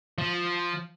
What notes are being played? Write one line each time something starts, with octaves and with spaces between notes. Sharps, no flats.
F3